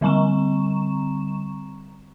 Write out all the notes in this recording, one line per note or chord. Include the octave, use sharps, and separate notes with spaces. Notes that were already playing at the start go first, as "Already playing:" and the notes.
D3 G3 C4 A#5 C#6 E7